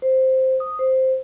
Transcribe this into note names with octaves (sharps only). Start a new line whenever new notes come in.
C5
D#6
C5